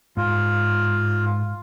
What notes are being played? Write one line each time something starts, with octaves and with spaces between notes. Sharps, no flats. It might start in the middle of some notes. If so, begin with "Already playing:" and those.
G#2 F4